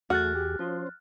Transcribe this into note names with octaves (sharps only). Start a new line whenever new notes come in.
E2 A3 F#4 G#4 F6 F#6 A6
G4
F3 C#4 C5